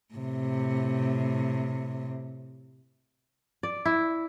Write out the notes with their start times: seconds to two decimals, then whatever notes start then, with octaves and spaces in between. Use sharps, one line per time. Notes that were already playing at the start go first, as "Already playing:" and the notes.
0.14 A2 C3
3.63 D5
3.85 E4